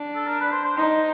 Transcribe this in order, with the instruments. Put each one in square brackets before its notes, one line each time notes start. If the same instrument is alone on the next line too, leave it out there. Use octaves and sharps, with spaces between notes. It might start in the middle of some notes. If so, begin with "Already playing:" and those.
Already playing: [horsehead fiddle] D4
[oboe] A4
A#4
B4
C5
C5
[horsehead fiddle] D#4 [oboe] C5